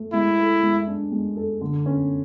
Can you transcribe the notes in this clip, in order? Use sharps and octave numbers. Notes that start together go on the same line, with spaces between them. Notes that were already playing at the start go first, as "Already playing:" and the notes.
Already playing: A3
G#3 E4
A4
G#3
D4
G#3
A4
D3
C#4